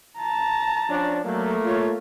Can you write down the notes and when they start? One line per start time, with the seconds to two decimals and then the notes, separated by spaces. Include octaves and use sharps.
0.19 A5 A#5
0.89 F3 C#4 D4
1.24 F#3 A3 A#3
1.64 F4 C#5